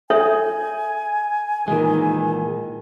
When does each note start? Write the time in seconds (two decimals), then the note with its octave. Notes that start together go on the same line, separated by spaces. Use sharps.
0.10 A4 C#5 E5 G#5
1.68 A#2 D#3 E3 G#3